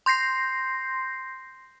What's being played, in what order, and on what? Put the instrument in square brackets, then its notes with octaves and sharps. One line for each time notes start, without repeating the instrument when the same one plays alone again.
[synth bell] C6 G6 A#6 C7